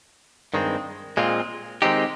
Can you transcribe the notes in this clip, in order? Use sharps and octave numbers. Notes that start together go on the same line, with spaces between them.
G2 D#3 G#3 C4
A#2 G#3 C4 F4
D#3 G#3 C4 D#4 G4